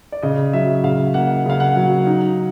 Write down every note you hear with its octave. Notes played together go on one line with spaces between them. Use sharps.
D5
C#3 D#5
F#3 E5
C#3 F5
A#3 F#5
C#3 F5
F#5
F#3
D#4